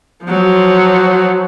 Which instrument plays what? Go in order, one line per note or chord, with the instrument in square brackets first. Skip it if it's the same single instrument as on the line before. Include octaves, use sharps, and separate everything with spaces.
[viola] F3 F#3